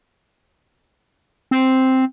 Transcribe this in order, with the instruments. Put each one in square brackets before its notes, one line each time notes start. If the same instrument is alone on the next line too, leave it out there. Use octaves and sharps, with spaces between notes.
[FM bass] C4